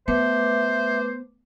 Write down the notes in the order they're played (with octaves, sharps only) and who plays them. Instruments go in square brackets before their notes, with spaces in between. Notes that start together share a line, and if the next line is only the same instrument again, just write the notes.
[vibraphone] A3 B4 D6 [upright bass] B3 [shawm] C5 [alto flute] E5